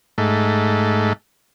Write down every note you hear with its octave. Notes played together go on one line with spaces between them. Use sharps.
G#2 A3